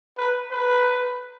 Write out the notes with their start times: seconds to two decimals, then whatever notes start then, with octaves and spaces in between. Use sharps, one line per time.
0.18 B4
0.51 B4